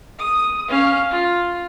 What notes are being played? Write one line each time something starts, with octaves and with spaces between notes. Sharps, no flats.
D#6
C#4 F5
F4